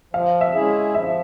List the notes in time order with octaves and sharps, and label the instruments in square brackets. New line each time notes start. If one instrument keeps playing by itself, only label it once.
[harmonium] F3 [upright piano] F5
[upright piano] E5
[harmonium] G#3 C#4 E4 G#4
[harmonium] F3 [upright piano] E5